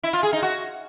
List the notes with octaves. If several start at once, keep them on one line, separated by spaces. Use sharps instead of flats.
E4
F4
G#4
D#4
F#4